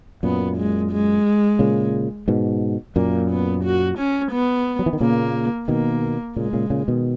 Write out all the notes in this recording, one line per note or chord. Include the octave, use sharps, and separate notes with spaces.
F#2 A#2 B3
G#3
G#3
A#2 C#3
G#2 B2
F#2 A#2 A#3
B3
F#4
C#4
B3
F#3
E3
D#3
A#2 C#3 A#3
B2 D#3 A#3
A#2 C#3 G#3
A#2 C#3
A#2 C#3
B2 D#3